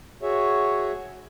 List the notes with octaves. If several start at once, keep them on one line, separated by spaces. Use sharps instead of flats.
F#4 G#4 C#5 E5